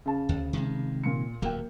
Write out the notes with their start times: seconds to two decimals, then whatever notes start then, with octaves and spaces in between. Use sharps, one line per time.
0.06 C#3 A5
0.29 D2
0.53 C3 D#3 G#3
1.04 A#2 C#7
1.42 D1 D#2 F#3 A#3 G5